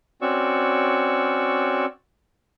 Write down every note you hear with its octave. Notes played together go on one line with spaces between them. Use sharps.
C4 C#4 F#4 D5 C#6 E6